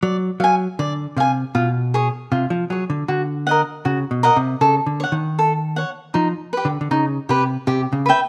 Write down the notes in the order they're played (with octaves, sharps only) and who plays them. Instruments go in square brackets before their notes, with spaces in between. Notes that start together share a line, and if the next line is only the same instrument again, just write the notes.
[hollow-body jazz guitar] F#3 [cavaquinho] D5
[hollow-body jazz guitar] F#3 [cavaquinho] F5 G#5
[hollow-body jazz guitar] D3 [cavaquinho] D5
[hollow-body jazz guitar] C3 [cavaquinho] F5 G#5
[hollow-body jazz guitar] B2 [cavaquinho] F4
[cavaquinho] G#4 C#5
[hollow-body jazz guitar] C3 [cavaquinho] F4
[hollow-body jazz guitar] F3
[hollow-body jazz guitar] F#3 [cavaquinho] G#4 C#5
[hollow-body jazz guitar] D3
[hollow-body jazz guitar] D3 [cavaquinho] F#4
[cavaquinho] A#4 D#5 F#5
[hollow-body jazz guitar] C#3 [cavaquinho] F#4
[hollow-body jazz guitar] B2
[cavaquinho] A#4 D#5 F#5
[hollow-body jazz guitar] C3
[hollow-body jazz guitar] C#3 [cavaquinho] A4
[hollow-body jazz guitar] D3
[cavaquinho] C#5 F#5
[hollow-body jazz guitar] D#3
[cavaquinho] A4
C#5 F#5
[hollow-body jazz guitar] F3 [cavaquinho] D#4
[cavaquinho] G4 B4
[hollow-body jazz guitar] D3
D3
[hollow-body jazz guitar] C#3 [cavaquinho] D#4
[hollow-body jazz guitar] C3 [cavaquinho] G4 B4
[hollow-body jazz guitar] C3 [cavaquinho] G4
[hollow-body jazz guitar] C#3
[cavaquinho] B4 E5 G5